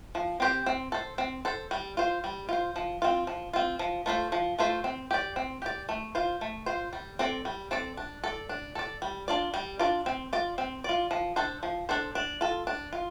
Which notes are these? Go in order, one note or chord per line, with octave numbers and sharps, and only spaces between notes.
F3
C4 G4 C5
C4
A4 C5
C4
A4 C5
G3
F4 C5
G3
F4 C5
F3
C4 F4
F3
C4 F4
F3
A3 F4 A4 C5
F3
A3 F4 A4 C5
C4
G4 D5
C4
G4 D5
A3
F4 C5
A3
F4 C5
G3
C4 A4 D5
G3
C4 A4 D5
D4
A4 D5
D4
A4 D5
G3
D4 F4 D5
G3
D4 F4 D5
C4
F4 D5
C4
F4 D5
F3
D4 A4 C5
F3
D4 A4 C5
D4
F4 A4
D4
F4